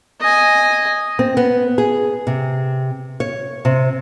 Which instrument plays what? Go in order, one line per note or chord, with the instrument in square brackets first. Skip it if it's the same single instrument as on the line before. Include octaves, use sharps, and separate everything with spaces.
[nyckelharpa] D#5 G#5
[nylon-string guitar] C4
B3
G#4
C3
C#5
C3